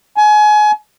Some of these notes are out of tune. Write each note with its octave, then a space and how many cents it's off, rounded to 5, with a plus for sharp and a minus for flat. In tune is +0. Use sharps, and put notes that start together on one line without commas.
G#5 +30